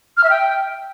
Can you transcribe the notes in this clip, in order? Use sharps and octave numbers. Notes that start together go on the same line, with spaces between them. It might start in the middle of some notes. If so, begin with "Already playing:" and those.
F6
E5
G5